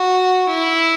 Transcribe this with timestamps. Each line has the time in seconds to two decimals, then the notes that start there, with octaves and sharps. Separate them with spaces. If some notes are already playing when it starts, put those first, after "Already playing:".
Already playing: F#4
0.48 E4